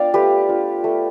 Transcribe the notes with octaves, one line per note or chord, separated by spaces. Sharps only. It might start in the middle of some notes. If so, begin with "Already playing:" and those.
Already playing: B3 D4 F4 D5 F5 G5
A3 G4 B4
D4 F4
A3